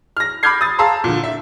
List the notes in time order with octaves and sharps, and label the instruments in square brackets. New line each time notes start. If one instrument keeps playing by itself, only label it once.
[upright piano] F6 A#6
B5 D6 F6 G6 G#6 C7
D#6 A6
G#4 F5 A5 A#5 C6 E6
A#2 D3
E5